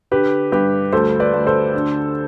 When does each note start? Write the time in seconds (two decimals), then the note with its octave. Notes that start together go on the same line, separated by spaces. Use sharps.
0.11 D3 G4 B4
0.52 G2 G4 B4
0.93 D2 A4 C5
1.20 B4 D5
1.33 D2
1.47 A4 C5
1.74 D3